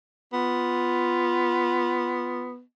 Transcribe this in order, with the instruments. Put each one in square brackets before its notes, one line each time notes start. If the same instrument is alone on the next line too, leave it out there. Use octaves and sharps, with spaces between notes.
[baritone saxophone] B3 [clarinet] F4